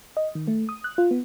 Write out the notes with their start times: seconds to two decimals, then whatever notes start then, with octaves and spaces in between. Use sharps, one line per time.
0.17 D#5
0.35 D#3
0.47 A3
0.69 D#6
0.84 F#6
0.98 F4
1.11 B3